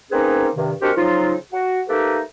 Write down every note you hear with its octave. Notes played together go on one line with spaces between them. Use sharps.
A#3 C4 C#4 D#4 G#4 B4
G2 C3 D#3
G#3 C4 D4 F#4 G4 A#4
C#3 F3 F#3 D#4 F4
F#4
A3 A#3 D#4 G4 A4 B4